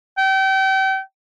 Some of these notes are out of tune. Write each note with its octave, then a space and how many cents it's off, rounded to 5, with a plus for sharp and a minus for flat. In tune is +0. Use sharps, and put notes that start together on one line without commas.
G5 -35